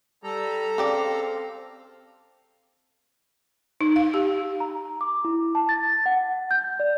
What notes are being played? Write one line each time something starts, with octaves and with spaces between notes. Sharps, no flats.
G3 A4 A#5
C#3 C4 G4 D5 F5
D#4
F5
G4
A#5
D6
E4
A5
A6
F#5
G6
D5